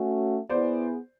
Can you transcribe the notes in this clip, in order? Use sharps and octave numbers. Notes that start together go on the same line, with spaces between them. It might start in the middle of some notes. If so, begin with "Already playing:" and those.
Already playing: A3 C#4 F#4
B3 E4 G#4 C5 D5